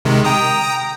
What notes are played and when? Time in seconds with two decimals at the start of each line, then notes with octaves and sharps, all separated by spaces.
0.05 C3 D#3 G#3
0.24 G5 A#5 D#6